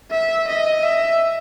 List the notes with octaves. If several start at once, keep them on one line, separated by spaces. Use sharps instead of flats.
E5
D#5
E5